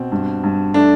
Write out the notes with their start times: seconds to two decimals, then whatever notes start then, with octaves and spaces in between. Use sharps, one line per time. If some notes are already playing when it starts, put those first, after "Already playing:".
Already playing: B2 C4
0.12 G2
0.43 G2
0.74 A3 D4